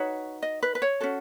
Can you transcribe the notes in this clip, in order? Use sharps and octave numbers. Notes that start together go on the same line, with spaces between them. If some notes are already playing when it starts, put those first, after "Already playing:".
Already playing: D#4 F#4 B4 C#5
D#5
B4
B4
C#5
C#4 F#4 A4